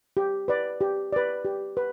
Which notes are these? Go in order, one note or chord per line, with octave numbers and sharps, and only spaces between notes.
G4
B4 D5
G4
B4 D5
G4
B4